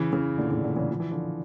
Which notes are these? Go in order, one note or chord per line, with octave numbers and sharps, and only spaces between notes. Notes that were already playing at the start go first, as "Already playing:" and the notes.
Already playing: C#3 E3
C#3 E3
A#2 D3
A2 C#3
A#2 D3
C#3 E3
F3
E3
D3 F3